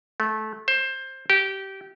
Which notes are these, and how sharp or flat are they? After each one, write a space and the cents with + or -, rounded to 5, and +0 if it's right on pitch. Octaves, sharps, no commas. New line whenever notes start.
A3 -20
C5 +15
G4 -20